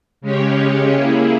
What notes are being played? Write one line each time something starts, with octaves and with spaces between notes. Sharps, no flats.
C#3 G#3 C#4 G4 C#5
A#3 E4 G#4